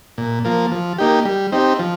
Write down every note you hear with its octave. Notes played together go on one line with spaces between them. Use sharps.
A#2
F3 A#3
F3
A#3 D#4 G4
G3
C4 D#4 G4
F3